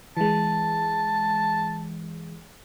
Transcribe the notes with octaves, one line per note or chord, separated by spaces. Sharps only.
E3 G#3 A5